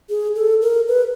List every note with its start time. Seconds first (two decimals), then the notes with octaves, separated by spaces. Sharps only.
0.10 G#4
0.36 A4
0.62 A#4
0.88 B4